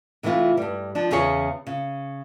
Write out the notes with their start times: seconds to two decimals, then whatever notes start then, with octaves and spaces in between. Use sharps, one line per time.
0.23 C3 E3 A3 E4 F4
0.57 G2 G3
0.95 F3 D4
1.11 E2 C#3 C#4 G#4 C#5
1.67 C#3